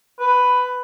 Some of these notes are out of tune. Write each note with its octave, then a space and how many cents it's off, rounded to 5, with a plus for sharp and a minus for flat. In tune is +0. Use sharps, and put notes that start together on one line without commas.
B4 +10